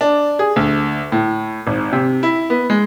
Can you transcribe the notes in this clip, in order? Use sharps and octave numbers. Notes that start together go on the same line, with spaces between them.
D4
G#4
D2
A2
G#1
C3
E4
B3
G#3